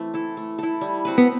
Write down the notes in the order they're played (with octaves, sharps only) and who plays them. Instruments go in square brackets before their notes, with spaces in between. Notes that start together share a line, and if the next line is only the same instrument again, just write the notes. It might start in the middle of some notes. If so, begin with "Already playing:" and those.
Already playing: [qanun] E3 A3 C4
E4 A4
A3
E4 A4
G3
C4 F#4 B4
[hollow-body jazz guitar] B3